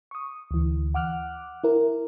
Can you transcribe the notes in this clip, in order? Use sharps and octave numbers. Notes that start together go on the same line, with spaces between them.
C#6 D#6
D2 E3
F#5 D6 F6 F#6
E4 A#4